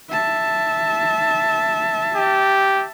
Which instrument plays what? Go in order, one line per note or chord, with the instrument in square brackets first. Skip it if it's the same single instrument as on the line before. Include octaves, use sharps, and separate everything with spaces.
[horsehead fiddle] E5 A5
[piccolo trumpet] G4